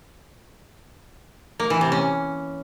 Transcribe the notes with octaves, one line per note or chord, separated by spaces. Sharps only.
A#3
E3
C3
C#4